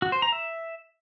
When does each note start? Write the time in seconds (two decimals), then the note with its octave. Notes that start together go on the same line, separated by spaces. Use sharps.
0.02 F#4
0.12 C5
0.22 A#5
0.32 E5